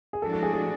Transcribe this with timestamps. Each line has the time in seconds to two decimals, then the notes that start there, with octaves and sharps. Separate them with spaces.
0.13 G#4
0.22 A2 F3 G#3 D4 F#4 A4
0.33 A4
0.43 G#4
0.53 G#4